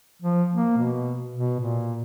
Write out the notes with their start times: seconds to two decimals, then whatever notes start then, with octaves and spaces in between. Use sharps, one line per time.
0.22 F3
0.54 A#3
0.77 B2
1.36 B2
1.60 A#2